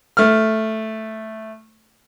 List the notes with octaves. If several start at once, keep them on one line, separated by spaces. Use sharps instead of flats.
A3 F6